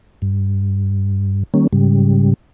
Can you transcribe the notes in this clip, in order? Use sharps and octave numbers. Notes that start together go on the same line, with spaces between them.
G2
D#3 G3 A#3 C#4
G#2 C#3 G3